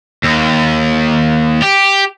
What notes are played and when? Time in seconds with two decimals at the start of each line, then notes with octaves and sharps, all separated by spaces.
0.24 D#2
1.62 G4